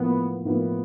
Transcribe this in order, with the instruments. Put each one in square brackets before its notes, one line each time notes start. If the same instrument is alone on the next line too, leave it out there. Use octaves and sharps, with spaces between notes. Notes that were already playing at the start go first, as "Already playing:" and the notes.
Already playing: [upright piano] A2 F3 A#3 [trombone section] B3
[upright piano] A2 F3 A#3 [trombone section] B3